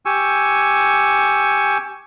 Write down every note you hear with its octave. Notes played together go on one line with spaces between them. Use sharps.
G4 G#5 C#6 E6